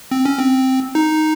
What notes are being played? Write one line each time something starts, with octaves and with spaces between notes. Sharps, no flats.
C4
C#4
C4
D#4